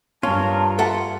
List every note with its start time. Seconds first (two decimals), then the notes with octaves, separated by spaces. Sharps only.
0.23 G2 C#4 F4 A#4 A5
0.79 A4 E5 F#5